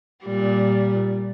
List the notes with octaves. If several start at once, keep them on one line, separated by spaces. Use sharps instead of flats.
A#2 G3